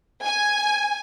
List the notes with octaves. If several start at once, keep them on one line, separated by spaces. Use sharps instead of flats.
G#5